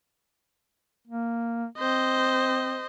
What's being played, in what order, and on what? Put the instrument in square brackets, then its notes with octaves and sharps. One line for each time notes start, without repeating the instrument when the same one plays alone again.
[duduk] A#3
[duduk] C4 [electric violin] C5 D#5